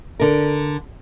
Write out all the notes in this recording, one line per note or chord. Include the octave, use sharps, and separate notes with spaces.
D3 A#4